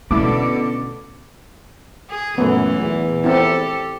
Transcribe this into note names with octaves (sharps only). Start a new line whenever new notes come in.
B2 D3 A3 C#4 E4 A4 D6
G#4
F#2 A#2 E3 A3 B3
E2
C4 E4 G4 A4